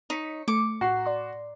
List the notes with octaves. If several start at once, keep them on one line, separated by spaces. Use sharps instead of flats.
D#4 C#5 B6 C#7
A3 D6 C#7
A2 F#4 A#5 C7
D5 C6